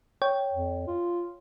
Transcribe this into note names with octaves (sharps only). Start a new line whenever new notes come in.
C#5 G5
F2
F4